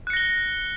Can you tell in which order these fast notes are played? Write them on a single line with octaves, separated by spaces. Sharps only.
F#6 C#7 A#6 G7